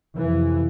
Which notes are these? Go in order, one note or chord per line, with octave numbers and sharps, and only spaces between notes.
F2 C3 E3